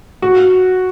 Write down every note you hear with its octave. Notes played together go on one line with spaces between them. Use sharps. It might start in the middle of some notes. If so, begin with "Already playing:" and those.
F#4